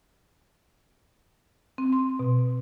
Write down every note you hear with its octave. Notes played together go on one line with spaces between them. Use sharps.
C4
C6
B2